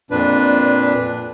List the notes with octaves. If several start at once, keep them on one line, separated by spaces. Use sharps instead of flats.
F2 A#2 D4 B4